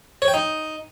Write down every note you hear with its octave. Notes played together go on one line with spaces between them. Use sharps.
C#5
G5
D#4